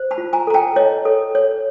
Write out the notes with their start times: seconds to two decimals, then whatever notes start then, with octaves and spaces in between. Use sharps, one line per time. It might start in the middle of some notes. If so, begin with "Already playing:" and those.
Already playing: C5
0.11 A5 B5
0.18 F4
0.33 G#5 A#5
0.47 A4 A#5
0.54 G5 A5
0.76 C#5 D#5
1.05 A4
1.35 C#5